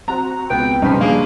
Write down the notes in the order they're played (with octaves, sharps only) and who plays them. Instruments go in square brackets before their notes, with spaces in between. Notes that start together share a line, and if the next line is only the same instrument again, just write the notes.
[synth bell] C4 F#4 [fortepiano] A#5
[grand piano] C#2 [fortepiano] B3 [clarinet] G5
[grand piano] G2 C#3 [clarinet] F3 [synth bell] C#4 B4 C6 [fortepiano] D#4
[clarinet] A#3 [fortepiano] D4 G#4